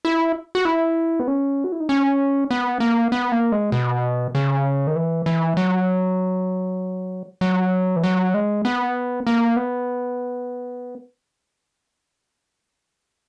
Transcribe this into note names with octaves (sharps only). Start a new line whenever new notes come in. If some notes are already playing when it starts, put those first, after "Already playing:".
E4
F#4
E4
B3
C#4
F#4
E4
D#4
C#4
B3
A#3
B3
A#3
G#3
B2
C#3
D#3
E3
E3
F#3
F#3
E3
F#3
G#3
B3
A#3
B3